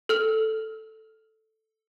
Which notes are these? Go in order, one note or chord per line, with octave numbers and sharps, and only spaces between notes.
A4 F6 F7